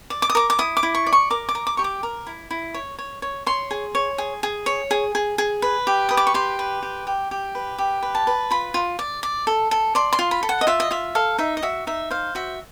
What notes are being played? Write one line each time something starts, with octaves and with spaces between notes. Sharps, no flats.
D5
D6
D#6
A#4 D6
D6
E4 D#6
D6
E4
C#6
D5
C#6
A#4 D6
D6
A#4
D6
G4 C#6
D6
A#4
E4
E4
C#5
C#5
C#5
C#5 C6
G#4
C#5
G#4
G#4
C#5
G#4
G#4
G#4
B4
G4
B4 D#6
D6
C#6
G4 C6
B4
G4
G4
G4
B4
G4
B4
A5
B4
F4 B5
F4
D5
D5
A4
A4
D5 C6
C6
F4
B5
A4
F#5
D#5
F4 E5
D#5
F4 E5
A4 F5
D#4 E5
D#5
F#4 E5
D#4 E5
C5 F5
F#4 E5